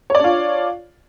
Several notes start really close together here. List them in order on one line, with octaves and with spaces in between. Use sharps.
C#5 D5 D4 F4